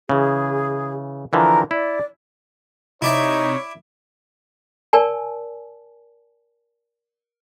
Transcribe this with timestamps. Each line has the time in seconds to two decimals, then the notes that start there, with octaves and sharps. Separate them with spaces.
0.09 C#3 E3 G#4
1.33 D3 E3 F3 A#4
1.71 E4 D5
3.02 C3 D#4 E4 C#5 D5 E5
4.93 A#4 D5 G#5 A5